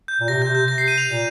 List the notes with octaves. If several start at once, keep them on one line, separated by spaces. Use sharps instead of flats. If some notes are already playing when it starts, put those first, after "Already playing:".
G6
A#2
C3 A#6
G6
C3
G6
C3 A#6
C7
D#7
F7
A#2